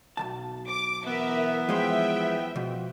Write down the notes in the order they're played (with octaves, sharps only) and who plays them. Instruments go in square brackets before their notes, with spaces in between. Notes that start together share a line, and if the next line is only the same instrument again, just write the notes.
[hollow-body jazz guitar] B1 C3 A5
[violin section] D6
[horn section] E3 B3 [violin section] A#4 E5
[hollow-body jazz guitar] F3 G#3 C6 [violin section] E5 G5
[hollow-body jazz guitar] B2 F3